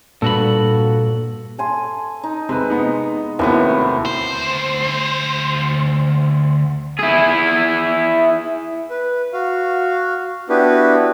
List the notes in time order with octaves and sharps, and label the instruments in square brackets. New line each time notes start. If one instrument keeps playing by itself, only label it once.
[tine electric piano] G2 A4 [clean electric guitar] A#2 F#4 B5
[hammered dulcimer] A4 G#5 C6
D#4
[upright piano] C3 B4 [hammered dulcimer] G#3
[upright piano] B3 D#4
[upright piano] D#2 C3 B3 [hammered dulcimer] A2 E4 F#4
[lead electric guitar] D2 C5
[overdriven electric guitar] E4 G#4
[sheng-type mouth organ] B4
F#4 F5
B3 D4 E4 F#4 G4 B4